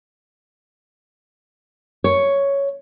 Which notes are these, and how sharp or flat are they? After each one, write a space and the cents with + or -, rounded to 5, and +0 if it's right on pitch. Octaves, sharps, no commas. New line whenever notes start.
C#5 +5